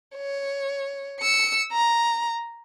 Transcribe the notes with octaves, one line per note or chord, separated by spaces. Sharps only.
C#5
E6 C#7
A#5